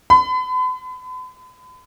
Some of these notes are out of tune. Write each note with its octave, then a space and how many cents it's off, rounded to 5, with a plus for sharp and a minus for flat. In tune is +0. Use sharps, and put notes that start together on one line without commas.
B5 +45